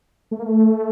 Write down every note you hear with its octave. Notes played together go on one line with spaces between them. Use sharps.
A3
A#3
A3